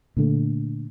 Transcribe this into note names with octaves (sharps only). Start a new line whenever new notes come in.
A#2 D3 A3